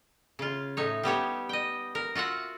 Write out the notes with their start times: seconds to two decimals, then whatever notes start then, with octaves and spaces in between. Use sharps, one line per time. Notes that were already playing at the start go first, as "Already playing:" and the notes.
0.39 C#3 F4
0.77 A2 D#4 C#5
1.03 G3 B3 G4 C#5
1.49 D#5 G5
1.95 A#4
2.15 F4 F#4 E5 F#5